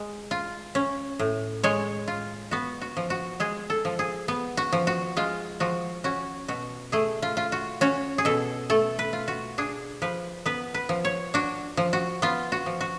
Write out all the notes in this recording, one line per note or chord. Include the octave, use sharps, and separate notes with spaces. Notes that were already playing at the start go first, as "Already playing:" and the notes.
Already playing: G#3
F4
C#4
A2
G#3 C#5
F4
B3 F#4
F#4
F3
F#4
G#3 G#4
A4
F3
G#4
B3
F#4
F3
F#4
G#3 F4
F3 F#4
C#4 F#4
B2 F#4
A3 G#4
F4
F4
F#4
C#4 F#4
G#4
B2 A4
A3 A4
B4
F4
F#4
D4 G#4
F3 B4
B3 B4
B4
F3
C#5
D4 F#4
F3
F#4
B3 F4
F#4
F3
F#4